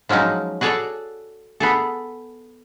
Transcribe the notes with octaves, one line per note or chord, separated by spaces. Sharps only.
F3 F#3 G#3 C#4 D#4
F#4 G#4 A4 C#5 D5
B3 G#4 A4